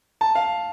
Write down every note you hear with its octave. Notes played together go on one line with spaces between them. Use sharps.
A5
F5